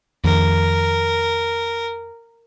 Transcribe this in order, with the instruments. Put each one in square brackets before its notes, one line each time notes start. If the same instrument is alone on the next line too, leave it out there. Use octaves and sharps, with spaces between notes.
[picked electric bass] F2 D#3 [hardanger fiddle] A#4